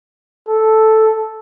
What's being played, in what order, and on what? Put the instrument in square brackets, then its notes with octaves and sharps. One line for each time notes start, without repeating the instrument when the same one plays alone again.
[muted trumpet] A4